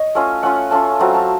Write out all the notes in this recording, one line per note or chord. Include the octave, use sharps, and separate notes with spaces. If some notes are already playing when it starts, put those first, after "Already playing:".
Already playing: C#5 D#5
A3 C#4 F4
A3 C#4 F4 F#5
A3 C#4 F4 A5
F#3 A3 C4 F4 A#5
A5